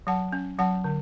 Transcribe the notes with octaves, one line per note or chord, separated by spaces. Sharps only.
F#3 F#5 A5
C#4
F#3 F#5 A5
D3